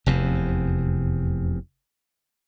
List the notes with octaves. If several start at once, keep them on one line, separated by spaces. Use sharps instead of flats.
F1 E2 C3